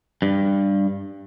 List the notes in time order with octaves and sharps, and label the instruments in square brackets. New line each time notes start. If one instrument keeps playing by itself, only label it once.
[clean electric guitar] G2